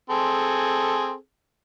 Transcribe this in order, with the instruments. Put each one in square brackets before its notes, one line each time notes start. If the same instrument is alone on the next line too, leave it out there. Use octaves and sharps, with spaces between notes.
[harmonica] C4 G#4 A4